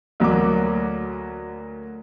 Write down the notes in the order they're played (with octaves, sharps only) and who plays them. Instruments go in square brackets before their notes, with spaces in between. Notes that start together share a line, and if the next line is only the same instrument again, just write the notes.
[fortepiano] D2 F#3 A#3 D6